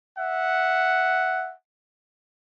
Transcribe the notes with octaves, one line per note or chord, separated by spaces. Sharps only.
E5 F#5